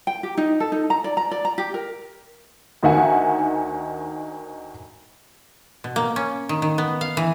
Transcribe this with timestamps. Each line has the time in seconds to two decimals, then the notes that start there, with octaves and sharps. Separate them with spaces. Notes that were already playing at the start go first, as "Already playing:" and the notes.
0.07 G5
0.23 G4
0.38 D#4
0.60 A4
0.72 D#4
0.90 A#5
1.04 D5
1.17 A#5
1.31 D5
1.45 A#5
1.58 G4
1.74 A#4
2.82 D2 D#3 E5 F#5 G#5
5.84 B2
5.96 A#3
6.16 C#4
6.49 D#3
6.62 D#3
6.78 B3
7.01 F5
7.17 E3